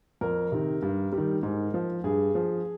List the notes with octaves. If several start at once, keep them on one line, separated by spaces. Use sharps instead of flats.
F2 A#4
C3 D#3
G2
G3
D#3
G#2
F3
G2 G#4
F3